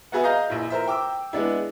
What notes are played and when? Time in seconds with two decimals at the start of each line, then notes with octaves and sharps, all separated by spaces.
0.12 B3 F#4 G#4 B4 E5
0.24 D#5 F5 A#5 G6
0.50 A#1 E4
0.70 A#4 C5 E5
0.87 G5 D6 E6
1.33 G#3 B3 D4 E4